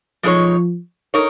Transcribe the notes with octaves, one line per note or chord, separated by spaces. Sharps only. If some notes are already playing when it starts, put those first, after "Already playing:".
B2 F3 G#3 D#4 A#4 C#5
D#4 A#4 C#5